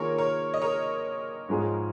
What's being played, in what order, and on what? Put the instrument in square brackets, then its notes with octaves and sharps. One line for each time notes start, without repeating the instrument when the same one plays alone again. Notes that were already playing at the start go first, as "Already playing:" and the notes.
Already playing: [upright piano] D#3 A#3 F4 G#4 [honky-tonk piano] A#4 C#5
[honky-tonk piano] A#4 C#5
D#5
A#4 C#5
[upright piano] G#2 F3 G#3 D#4 G#4